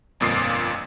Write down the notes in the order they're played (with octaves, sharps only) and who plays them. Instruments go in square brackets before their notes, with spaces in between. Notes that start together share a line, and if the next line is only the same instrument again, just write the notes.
[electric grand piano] G1 F2 A#2 D#6 C7